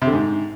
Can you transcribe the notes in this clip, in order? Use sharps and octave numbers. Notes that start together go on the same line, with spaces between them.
C3
D3
G#2